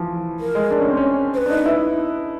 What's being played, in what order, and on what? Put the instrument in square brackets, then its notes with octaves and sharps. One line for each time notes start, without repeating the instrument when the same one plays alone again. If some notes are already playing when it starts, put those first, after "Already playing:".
Already playing: [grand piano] E3 F3
[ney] A#4
[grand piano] G#3
D4
C#4
C4
C#4
[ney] C5
B4
[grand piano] D4
D#4
E4